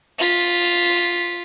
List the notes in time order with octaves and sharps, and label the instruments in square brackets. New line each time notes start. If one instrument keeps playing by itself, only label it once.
[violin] F4 B6